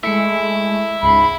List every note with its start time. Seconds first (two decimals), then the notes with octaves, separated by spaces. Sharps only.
0.03 G#3 A3 E4 E5 C#7
1.02 C#2 G#2 B5 C7